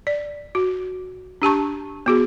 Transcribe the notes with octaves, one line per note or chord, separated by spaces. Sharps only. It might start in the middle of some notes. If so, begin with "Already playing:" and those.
D5
F#4
D4 G4 A5 C#6
B3 F#4 G#4